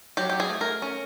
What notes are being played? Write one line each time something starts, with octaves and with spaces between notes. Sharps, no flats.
F#3 G4
G4
G#4
A3
A#4
C#4